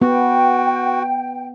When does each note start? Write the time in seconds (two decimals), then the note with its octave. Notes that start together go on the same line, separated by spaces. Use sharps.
0.02 B3 F#4 G5